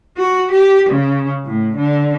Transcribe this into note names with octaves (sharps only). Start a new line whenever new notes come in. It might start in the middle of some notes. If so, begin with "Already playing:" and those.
F#4
G4
C#3
A2
D3